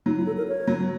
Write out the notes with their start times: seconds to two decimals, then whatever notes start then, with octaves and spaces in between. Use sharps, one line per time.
0.06 F#3 D#4
0.17 E4
0.27 A4
0.37 A#4
0.48 C#5
0.67 F#3